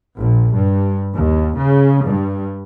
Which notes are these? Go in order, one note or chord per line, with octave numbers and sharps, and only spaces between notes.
A#1
G2
D#2
C#3
G2